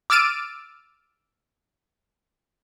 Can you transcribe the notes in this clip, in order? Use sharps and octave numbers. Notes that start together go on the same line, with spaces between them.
D6 E6 F6 A6 D7 D#7